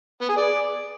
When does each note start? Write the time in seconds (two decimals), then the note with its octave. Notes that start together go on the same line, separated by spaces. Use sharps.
0.21 B3
0.29 G#4
0.36 D5